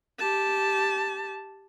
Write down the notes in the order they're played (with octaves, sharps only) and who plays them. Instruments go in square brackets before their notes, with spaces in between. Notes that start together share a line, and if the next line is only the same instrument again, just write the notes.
[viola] G4 A5